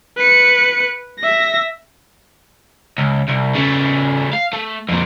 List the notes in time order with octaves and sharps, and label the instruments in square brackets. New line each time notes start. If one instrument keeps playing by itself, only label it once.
[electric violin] B4 C#7
E5 A#6
[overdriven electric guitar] C#2
C2
C#3 A3
F5
A3
F2 A#2